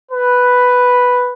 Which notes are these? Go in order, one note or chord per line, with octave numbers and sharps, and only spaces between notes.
B4